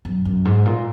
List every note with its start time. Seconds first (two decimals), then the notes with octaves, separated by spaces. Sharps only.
0.05 F#2
0.25 F#2
0.45 G#2
0.65 A#2